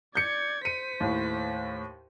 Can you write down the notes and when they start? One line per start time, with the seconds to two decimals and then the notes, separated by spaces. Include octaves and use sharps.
0.15 D5 G6 G#6 C#7
0.65 C5 B6 C#7 D#7
1.00 D#2 A2